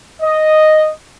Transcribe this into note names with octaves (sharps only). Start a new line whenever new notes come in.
D#5